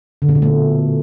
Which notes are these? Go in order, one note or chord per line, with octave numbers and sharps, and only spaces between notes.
D3
A#2
B2
A3